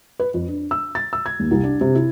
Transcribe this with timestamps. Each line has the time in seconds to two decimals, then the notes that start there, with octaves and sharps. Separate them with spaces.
0.20 B4
0.34 F2
0.48 D4
0.71 E6
0.95 A6
1.13 E6
1.26 G#6
1.39 D#2
1.51 C2
1.64 D4
1.81 C3
1.95 E4